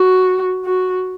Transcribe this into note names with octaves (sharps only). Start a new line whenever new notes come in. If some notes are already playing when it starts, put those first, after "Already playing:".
Already playing: F#4
F#4